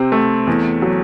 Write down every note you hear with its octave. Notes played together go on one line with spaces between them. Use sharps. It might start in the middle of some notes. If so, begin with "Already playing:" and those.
Already playing: C3 C4
A3
E2
F#3